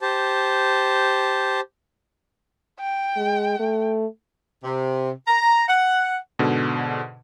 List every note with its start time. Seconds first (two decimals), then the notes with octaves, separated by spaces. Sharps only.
0.01 G4 C5 A5
2.80 G5
3.17 G#3
3.59 A3
4.64 C3
5.27 A#5
5.68 F#5
6.39 G#2 B2 D3